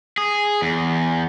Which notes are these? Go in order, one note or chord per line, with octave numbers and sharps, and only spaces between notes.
G#4
E2